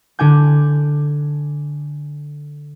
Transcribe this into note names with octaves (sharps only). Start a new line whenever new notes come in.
D3 D4 G#5 G6